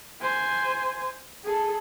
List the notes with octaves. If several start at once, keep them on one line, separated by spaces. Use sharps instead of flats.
C5 G#5
G#4 A4